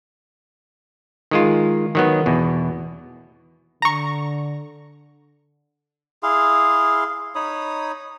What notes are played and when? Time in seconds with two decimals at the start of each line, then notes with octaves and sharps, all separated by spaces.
1.31 D#3 G#3 F4
1.95 D#3 F#3 B3
2.26 E2 B2
3.82 D3 A#5 C#6
6.23 E4 G#4 F5 C6
7.35 D#4 C#5 B5 D#6